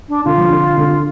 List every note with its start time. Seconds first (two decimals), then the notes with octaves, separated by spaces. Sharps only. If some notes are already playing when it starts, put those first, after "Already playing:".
0.09 D4
0.25 D3 F4
0.38 F3
0.50 D3
0.77 D3